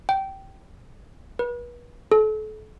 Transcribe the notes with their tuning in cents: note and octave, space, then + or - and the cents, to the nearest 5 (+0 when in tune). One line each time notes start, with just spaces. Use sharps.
G5 -15
B4 -35
A4 -35